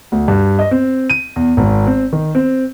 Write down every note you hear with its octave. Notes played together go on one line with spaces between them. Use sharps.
D2
G2
D#5
C4
D#7
E2
G#1
C4
D#3
C4